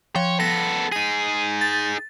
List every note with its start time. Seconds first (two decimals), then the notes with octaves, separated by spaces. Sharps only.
0.16 F3 C#5 G5
0.40 B3 A4 A#6
0.92 D#4 G#4 D#7
1.61 A6